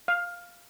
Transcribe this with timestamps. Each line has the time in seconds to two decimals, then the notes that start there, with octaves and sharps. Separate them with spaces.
0.08 F5